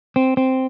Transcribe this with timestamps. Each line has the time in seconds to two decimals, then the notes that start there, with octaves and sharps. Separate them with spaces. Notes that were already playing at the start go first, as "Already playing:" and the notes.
0.16 C4
0.37 C4